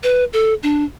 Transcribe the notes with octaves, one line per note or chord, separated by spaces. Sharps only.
B4
A4
D4